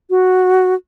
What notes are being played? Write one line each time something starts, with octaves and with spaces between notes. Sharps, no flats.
F#4